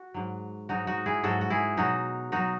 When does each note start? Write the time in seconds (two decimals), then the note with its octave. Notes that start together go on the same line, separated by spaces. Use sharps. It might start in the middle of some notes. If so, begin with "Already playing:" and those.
Already playing: F#4
0.14 G#2 F#3
0.69 G#2 F#3 D#4 F#4
0.87 D#4 F#4
1.06 E4 G#4
1.23 G#2 F#3 F#4 A4
1.41 F#4
1.50 E4 G#4
1.77 B2 F#3 D#4 F#4
2.32 B2 F#3 D#4 F#4